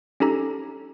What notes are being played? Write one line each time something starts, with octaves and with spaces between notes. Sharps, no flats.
C#4 D#4 G4 A4 A#5